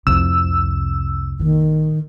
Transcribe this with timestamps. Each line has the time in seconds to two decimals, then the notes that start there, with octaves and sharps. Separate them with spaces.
0.07 C2 F2 C3 E6
1.40 A#1 A#2 D#3